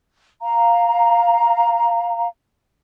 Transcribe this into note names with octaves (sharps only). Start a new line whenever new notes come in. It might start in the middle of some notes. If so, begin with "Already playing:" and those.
F5 A#5